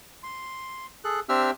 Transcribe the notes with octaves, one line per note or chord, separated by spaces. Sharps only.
C6
G#4 A4 F#6
C4 D4 G4 E5 E6 F6